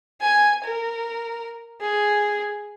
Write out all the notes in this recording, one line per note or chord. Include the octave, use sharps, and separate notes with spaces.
G#5
A#4
G#4